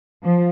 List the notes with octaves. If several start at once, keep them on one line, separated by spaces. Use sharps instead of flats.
F3